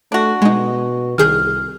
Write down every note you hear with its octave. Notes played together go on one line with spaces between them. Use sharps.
A3 D4 F#4
B2 G#3 D#4
C2 D#3 G#4 F6 G6